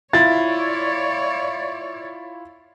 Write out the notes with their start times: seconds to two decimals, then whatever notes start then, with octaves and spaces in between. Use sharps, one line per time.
0.13 E4 F4 C#5 D5 A6